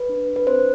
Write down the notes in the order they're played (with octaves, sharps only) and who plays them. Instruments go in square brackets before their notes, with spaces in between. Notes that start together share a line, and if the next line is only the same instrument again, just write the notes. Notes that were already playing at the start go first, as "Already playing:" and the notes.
Already playing: [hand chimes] B4
D4
D4
B4
C4 C5